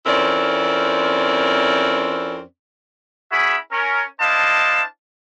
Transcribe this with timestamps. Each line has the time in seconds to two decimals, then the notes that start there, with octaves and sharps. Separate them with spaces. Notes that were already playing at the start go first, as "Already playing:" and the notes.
0.06 F2 C4 C#4 E4 A#4 D5
3.31 C#4 E4 F#4 G#4 E5 B5
3.72 C#4 A#4
4.20 D4 E4 C5 D#5 F5 A5